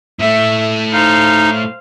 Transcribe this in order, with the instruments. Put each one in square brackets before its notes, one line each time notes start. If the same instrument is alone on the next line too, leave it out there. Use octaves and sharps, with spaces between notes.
[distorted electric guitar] A2 A3 [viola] E5
[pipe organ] D#4 [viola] C5 F5